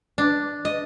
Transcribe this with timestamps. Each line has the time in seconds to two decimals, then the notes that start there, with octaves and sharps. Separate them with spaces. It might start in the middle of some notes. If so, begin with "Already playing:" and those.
0.18 D4
0.65 D#5